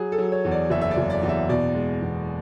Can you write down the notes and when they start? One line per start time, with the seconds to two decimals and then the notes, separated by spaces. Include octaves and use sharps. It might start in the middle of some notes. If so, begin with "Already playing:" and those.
Already playing: F#3 G#4
0.12 A4
0.18 F#3
0.32 C#5
0.45 E2
0.51 D5
0.70 F#1 E5
0.81 E5
0.91 D5
0.97 F#1
1.10 D5
1.23 E2
1.29 E5
1.49 B2 D5
1.75 G#3
2.02 E2